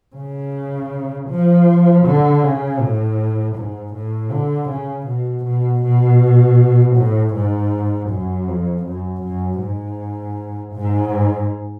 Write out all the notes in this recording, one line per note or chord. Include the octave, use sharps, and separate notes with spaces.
C#3
F3
D3
C#3
A2
G#2
A2
D3
C#3
B2
B2
B2
A2
G#2
F#2
F2
F#2
F#2
G#2
G#2